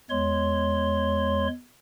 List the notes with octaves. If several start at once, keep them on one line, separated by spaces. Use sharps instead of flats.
E2 G#3 C#5 C6